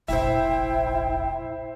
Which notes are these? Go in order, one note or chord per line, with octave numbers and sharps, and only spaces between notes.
F1 A#1 E4 C5 E5 G5